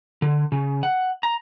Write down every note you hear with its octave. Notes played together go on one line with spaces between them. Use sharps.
D3
C#3
F#5
A#5